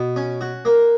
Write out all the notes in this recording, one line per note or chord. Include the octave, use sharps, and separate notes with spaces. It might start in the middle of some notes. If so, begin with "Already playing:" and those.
Already playing: B2
C#4
F#4
A#3